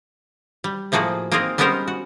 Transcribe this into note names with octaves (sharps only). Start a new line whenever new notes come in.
G3
A2 F3 A#3 F#4 G#4
A#3 C4 D#4 F4 G#4 A#4
G3 G#3 B3 C#4 A#4 C5
F#4